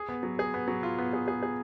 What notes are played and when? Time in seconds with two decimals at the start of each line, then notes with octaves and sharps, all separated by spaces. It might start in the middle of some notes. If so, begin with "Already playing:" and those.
Already playing: G#4
0.09 B3
0.23 F#3
0.39 G#4
0.54 B3
0.68 F#3
0.83 F4
0.98 B3
1.13 G#4
1.28 G#4
1.43 G#4